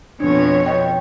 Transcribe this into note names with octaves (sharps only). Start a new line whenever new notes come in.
F2 B2 D4 C#5
D#5 G5